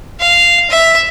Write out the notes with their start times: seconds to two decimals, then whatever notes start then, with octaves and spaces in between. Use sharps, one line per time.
0.20 F5
0.70 E5